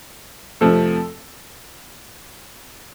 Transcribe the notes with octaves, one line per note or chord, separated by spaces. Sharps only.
F2 C3 F3 A3 A4